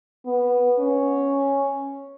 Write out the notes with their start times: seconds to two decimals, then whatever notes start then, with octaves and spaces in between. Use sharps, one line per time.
0.26 B3
0.79 C#4